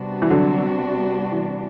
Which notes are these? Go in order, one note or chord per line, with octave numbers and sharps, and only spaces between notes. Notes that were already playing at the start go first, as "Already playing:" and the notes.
Already playing: C3 G3 B3 D4 F#4
E3
D3 F#3
E3